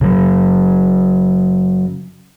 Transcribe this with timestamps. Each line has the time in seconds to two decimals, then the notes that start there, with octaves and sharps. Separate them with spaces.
0.01 C#3 F#3